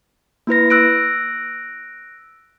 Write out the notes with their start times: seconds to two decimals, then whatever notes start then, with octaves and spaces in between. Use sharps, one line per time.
0.47 A#3 E4 B4 A#6
0.70 E6 F#6 A#6 D7